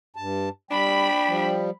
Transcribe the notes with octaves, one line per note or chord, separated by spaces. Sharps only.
G2 A5
G3 D4 G5 B5
F3 G3